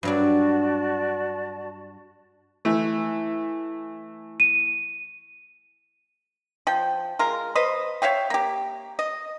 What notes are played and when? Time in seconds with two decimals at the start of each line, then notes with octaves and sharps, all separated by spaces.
0.03 G2 F#3 D4 F#4 D5 A5
2.65 E3 A3
4.40 D#7
6.67 F3 G5
7.19 G#3 F4 A#4
7.55 B4 C5 D#5
8.02 C#5 E5 F5 G5
8.30 A#3 G4
8.99 D#5